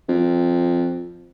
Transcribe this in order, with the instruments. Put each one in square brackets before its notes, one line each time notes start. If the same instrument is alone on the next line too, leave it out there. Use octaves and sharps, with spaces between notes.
[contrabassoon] F2